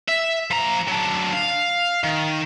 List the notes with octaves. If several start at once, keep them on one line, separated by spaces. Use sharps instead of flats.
E5
F3 A#5
F#3 D4
F5
D#3